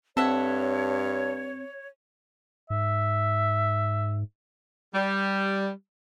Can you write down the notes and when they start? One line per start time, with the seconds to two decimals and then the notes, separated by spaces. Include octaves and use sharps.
0.17 G2 C4 A4 C#5 E5 F#5
2.70 G#2 E5
4.94 G3